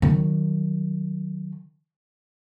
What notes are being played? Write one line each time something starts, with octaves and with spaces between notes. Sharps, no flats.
D#3 F#3